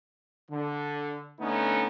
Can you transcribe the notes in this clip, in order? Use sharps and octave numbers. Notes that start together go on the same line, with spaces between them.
D3
D3 A3 B3 C#4 D#4